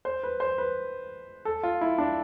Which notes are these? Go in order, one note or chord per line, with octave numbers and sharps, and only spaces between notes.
C5
B4
C5
B4
A4
F4
E4
D4